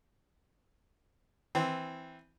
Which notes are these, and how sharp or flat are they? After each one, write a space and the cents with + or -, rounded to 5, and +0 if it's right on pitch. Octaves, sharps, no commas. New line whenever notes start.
E3 -5 C4 -5